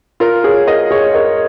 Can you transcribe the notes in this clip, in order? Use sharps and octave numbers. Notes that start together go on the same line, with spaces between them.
F4 A#4
G#4 C#5
A#4 D#5
G#4 C#5
A#4 D#5